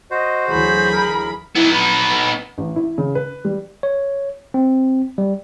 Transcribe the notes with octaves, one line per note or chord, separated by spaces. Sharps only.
F#4 C5 D#5
D2 E3 F#3 G#4 B5 G6
A#4
B3 D#4 E4
B5
A1
E4
C#3
B4
G3
C#5
C4
G3